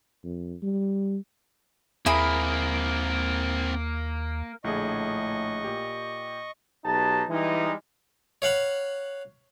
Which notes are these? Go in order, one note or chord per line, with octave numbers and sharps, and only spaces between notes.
F2
G3
D#2 A#3 C4 E4 G#4 A#4 B5
A#1 A2 D3 G#4 D#5 C#6
A#2 G4
B1 B2 D#4 G4 A5
E3 G3 G#3 D#4
C#5 F5 F#5 B5